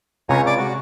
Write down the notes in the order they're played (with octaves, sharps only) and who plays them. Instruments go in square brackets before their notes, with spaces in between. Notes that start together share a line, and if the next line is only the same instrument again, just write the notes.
[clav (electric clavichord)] C#2 [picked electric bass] C3 [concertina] C#5 G#5 A#5
[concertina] D5 D6
F#4